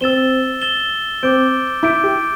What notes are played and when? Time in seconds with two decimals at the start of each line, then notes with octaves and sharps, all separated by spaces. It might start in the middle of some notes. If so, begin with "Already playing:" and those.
0.01 C4 E6 A6 E7 G7
0.62 E6 A6 E7 G7
1.23 C4 D6 G6 D7
1.83 E4 D6 G6 D7
2.04 G4